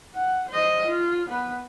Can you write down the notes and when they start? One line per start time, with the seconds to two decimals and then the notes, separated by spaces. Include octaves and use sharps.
0.15 F#5
0.49 C5 D#5
0.87 F4
1.28 B3 B4